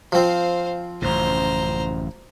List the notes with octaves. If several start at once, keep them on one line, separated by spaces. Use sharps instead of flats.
F3 C4 C5 F5
A1 F#2 C#3 C5 A#5